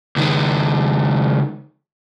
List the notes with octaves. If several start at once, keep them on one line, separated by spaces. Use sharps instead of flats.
C#2 D#3